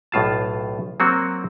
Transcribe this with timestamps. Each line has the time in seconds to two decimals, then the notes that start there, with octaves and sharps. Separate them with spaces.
0.12 B1 A2 F4 A5
1.00 F#3 A#3 C4 F#4